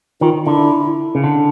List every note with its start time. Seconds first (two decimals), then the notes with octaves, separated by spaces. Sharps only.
0.21 D#3 F4
0.47 D3 E4
1.15 C#3
1.24 D3